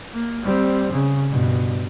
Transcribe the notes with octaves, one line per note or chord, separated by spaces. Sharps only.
A#3
G3 C4
C#3
G2 B2